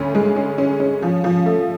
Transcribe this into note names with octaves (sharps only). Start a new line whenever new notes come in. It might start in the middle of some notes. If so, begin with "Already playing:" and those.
Already playing: D2 C#4
G#3
C#4
C#4
C#4
F3
F3
A3